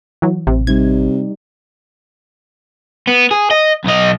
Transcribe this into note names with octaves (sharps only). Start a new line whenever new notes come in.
E3 F#3
A1 C3
C3 G3 D#4 G#6
B3
G#4
D#5
B1 D#5